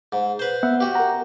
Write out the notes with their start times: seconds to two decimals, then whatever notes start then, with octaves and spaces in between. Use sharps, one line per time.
0.12 G#2
0.39 B4 C5
0.63 B3 E5 F#5
0.80 F#4 G4
0.95 A#4 A#5